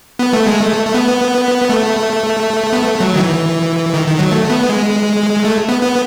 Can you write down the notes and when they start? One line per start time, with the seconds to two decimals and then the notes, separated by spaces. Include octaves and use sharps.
0.19 B3
0.33 A3
0.47 G#3
0.60 A3
0.86 A3
0.94 B3
1.70 A3
2.73 B3
2.82 A3
3.00 F#3
3.16 D#3
3.19 E3
3.94 D#3
4.07 D#3
4.19 F#3
4.31 A3
4.50 B3
4.69 G#3
5.45 A3
5.69 B3
5.82 B3